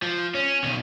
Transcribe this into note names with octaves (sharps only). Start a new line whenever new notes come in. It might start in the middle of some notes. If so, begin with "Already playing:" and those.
F3
C#4
B2 D#3